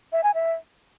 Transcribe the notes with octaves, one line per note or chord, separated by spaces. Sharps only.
E5
G#5
E5